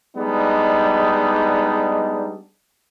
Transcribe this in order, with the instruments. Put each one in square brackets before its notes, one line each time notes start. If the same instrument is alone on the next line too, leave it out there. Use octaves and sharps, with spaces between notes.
[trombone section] G3 G#3 B3 D4 D#4